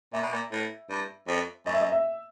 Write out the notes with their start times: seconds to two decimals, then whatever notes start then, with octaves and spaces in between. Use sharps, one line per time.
0.13 A#2 E5
0.23 B2
0.33 A#2
0.52 A2
0.90 G2
1.28 F2
1.66 F#2 D#5
1.74 E5
1.81 D#5
1.92 E5